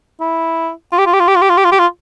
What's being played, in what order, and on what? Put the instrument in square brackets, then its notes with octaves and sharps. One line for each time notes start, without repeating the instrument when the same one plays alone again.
[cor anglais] E4
F4
G4
F4
G4
F4
G4
F4
G4
F4
G4
F4
G4
F4